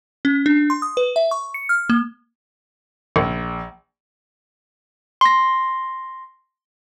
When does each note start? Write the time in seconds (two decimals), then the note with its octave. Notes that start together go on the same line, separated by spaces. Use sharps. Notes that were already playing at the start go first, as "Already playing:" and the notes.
0.25 C#4
0.46 D4
0.70 C6
0.82 D#6
0.97 B4
1.16 E5
1.31 C#6
1.54 C#7
1.69 F6
1.90 A#3
3.16 A#1
5.21 C6 A#6